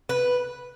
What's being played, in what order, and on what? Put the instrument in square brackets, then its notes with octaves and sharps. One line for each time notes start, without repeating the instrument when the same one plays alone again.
[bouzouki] B4